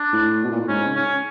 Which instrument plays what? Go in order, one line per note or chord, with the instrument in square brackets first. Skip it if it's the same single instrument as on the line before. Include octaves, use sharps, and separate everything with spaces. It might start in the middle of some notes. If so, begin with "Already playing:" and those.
Already playing: [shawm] D4
[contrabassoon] A2
B2
A#2
A2
[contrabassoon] G#2 [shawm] C#4
[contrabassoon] C#3
[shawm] C#4